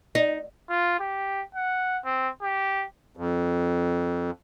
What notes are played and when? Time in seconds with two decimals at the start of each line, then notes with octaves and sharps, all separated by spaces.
0.15 D#4
0.69 F4
1.00 G4
1.55 F#5
2.05 C4
2.42 G4
3.17 F2